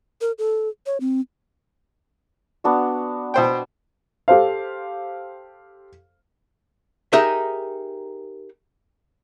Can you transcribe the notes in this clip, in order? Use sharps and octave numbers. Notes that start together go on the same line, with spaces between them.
A#4
A4
C#5
C4
B3 D4 F#4
B2 C5 G5
G4 A4 C5 F5
D#4 G4 G#4 A#4 E5